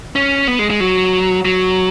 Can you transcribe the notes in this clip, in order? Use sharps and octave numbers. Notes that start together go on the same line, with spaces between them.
C#4
B3
G#3
G#3
F#3
F#3